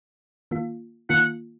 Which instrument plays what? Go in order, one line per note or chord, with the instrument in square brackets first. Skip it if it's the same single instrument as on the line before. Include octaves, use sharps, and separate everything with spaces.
[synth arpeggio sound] D#3 A#3 F4
[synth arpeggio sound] D#3 A#3 F4 [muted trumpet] F#5